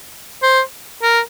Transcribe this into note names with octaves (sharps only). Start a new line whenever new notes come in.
C5
A#4